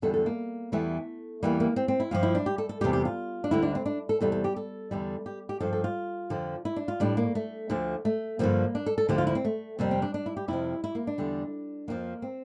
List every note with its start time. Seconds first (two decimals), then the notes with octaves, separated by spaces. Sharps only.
0.02 E2 D3 G3 A4
0.14 A4
0.26 A#3
0.72 E2 E3 G3 A3
1.43 E2 E3 G3 A#3
1.60 A#3
1.76 C4
1.88 C4
2.00 E4
2.11 G2 F3 F4
2.23 E4
2.35 D4
2.46 G4
2.58 A4
2.69 A4
2.81 E2 C3 G3 G4
2.93 G4
3.05 F4
3.44 D4
3.51 D2 D3 G3 E4
3.62 D4
3.75 C4
3.86 D4
4.09 A4
4.21 E2 C3 G3 A4
4.32 A4
4.44 G4
4.56 A4
4.91 E2 D3 G3
5.26 G4
5.49 G4
5.60 G2 F3 A4
5.73 A4
5.84 F4
6.30 F2 D3 F3
6.65 E4
6.76 D4
6.88 F4
7.00 A2 G3 D4
7.17 A#3
7.35 A3
7.70 D2 D3 F3
8.05 A3
8.39 G2 D3 F3 A#3
8.75 D4
8.86 A4
8.98 A4
9.09 D2 D3 F3 G4
9.18 F4
9.27 E4
9.35 C4
9.45 A3
9.79 F2 C3 G3 A#3
9.91 C4
10.02 D4
10.14 D4
10.26 E4
10.37 G4
10.48 F2 C3 F3 E4
10.84 E4
10.95 A#3
11.07 D4
11.18 E2 D3 G3
11.88 F2 D3 F3 A#3
12.22 C4